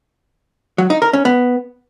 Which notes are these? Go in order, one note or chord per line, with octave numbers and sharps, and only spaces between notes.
F#3
D#4
A#4
C#4
B3